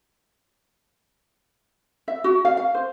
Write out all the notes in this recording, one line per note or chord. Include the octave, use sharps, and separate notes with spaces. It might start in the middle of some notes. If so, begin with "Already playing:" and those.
E5
F#4
F5
F5
C5